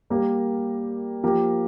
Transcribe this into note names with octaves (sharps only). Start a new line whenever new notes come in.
G3 A#3 G4 A#4
F3 A#3 G4 A#4